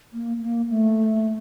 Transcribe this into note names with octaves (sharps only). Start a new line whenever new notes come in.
A#3
A#3
A3